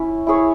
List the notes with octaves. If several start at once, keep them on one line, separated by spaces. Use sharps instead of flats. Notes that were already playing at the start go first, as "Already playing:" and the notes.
Already playing: C#4 E4
E4 G#4 C#5